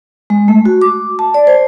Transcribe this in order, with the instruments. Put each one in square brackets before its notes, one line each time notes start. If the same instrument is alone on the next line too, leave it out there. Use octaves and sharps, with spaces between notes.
[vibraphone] G#3
A3
F#4
D6
A5
D5
C5